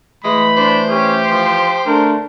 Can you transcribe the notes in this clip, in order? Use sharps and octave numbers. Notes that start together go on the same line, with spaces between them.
E3 G#3 A3 B5
D4 C5
C#4 G4
F3
D3 A3 D4 A#4